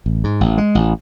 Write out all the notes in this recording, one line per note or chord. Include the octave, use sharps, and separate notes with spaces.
A1
G#2
A1
G#3
A1